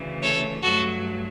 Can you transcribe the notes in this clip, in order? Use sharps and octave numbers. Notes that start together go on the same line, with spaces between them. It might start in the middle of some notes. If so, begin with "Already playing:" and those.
Already playing: D2 C#3 E3 A3
A4 C#5
G2 F#3 A3 F#4 A4